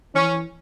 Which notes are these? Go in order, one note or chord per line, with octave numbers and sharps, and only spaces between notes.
E3 C#4